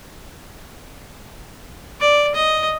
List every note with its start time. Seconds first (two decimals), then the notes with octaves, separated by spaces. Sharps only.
2.00 D5
2.35 D#5